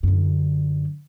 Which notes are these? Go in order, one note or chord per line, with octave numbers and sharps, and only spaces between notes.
F#2 D3